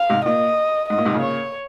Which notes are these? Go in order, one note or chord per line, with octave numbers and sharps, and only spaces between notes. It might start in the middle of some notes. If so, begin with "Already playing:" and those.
Already playing: F5
G#2 C3
A#2 D#5
G#2 D#5
A#2
G#2 C3
A#2 C#3
C#5